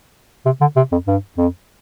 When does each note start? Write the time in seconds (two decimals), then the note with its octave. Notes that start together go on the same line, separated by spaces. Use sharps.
0.46 C3
0.61 D3
0.76 C3
0.92 F2
1.07 G2
1.38 F2